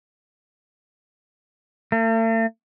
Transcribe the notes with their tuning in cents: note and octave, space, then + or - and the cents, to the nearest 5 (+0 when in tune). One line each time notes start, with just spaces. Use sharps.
A3 +45